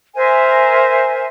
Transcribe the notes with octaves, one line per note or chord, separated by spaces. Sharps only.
A#4 C5 E5 G#5